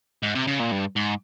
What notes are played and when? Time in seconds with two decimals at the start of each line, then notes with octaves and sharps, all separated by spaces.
0.23 G#2
0.35 C3
0.47 C#3
0.60 A#2
0.72 G2
0.96 G#2